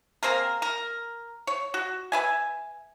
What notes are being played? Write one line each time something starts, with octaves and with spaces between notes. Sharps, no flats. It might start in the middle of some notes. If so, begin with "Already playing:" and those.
A#3 C4 G#4 A#4
A#4
C#5
F#4
B4 E5 G#5